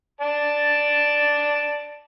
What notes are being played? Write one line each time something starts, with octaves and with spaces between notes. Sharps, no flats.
D5 A5